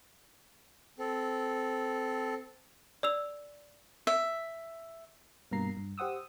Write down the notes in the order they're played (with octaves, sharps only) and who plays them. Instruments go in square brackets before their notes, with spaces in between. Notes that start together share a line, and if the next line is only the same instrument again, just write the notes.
[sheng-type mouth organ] C4 A4
[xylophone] D5 E6 F7
[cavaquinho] E5
[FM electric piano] G2 B2 A#3 A#5 C7
G2
G4 C5 F#5 D#6 E6